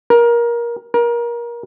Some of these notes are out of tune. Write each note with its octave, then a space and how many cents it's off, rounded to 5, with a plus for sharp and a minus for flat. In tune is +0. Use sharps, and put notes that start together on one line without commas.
A#4 +20
A#4 +25